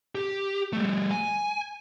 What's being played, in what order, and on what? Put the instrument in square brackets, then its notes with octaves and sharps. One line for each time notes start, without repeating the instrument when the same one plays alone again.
[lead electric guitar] G4
G3 A3
G#5